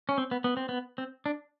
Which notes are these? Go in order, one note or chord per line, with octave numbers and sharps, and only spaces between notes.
C#4
C4
B3
B3
C4
B3
C4
D4